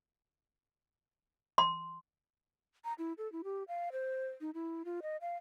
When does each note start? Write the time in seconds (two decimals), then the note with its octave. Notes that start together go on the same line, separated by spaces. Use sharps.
1.58 C6
2.84 A#5
2.98 E4
3.18 A4
3.32 E4
3.44 G4
3.68 F5
3.92 C5
4.41 D#4
4.54 E4
4.85 F4
5.02 D#5
5.21 F5